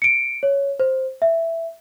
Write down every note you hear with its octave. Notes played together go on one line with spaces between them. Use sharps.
C#7 D7
C#5
C5
E5